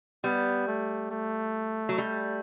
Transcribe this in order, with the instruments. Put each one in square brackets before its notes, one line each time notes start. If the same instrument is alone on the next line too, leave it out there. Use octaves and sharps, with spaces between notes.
[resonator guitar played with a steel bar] G3 [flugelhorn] B3
[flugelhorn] A3
A3
[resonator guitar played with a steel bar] F#3
G3